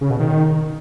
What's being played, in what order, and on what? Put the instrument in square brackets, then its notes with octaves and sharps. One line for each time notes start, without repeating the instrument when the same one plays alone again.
[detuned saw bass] C#3
B2
D#3